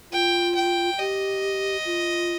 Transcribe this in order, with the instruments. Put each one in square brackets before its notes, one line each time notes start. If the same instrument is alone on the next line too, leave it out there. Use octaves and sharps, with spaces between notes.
[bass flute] F4 [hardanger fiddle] G5
[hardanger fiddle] G5
[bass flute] G4 [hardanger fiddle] D#5
[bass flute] F4